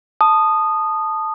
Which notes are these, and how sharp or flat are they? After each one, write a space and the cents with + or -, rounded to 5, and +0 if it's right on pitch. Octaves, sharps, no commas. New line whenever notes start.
A5 +0 D#6 -15